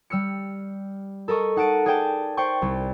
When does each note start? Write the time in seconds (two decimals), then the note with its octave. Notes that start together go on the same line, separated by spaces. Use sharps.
0.10 G3 E6 F6 C#7
1.28 A4 A#4 D#5 C#6
1.56 D#4 F#5 A5 D7 D#7
1.86 G#4 D5 G5 A5
2.37 C5 D5 G5 C#6
2.62 C2